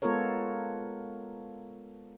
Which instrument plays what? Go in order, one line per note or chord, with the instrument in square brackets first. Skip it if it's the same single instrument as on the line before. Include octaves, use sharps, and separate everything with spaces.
[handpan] G#3 B3 F4 A4 A#4 C#5